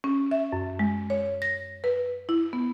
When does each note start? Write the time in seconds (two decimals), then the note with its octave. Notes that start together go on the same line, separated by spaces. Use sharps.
0.04 C#4
0.31 E5
0.52 F#2
0.79 G#3
1.10 C#5
1.42 A#6
1.84 B4
2.29 E4
2.53 B3